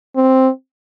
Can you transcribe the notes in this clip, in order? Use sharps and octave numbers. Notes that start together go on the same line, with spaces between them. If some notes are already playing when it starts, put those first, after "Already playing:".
C4